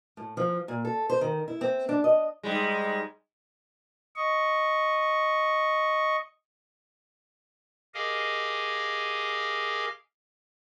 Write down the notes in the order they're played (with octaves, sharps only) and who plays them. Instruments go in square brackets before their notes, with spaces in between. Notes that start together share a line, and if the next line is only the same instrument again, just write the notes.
[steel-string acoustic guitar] A2
F3
A#2
A4
C5
D#3
E4
C4
D4
D#5
[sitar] G#2 G3 G#3
[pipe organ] D#5 C#6
G4 G#4 A#4 D#5 F5 G#5